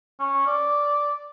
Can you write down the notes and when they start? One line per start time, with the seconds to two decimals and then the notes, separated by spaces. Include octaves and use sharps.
0.20 C#4
0.47 D5